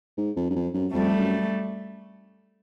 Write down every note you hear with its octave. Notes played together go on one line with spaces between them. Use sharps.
G#2
F2
F#2
F2
F#2
F2 G3 A3
F#2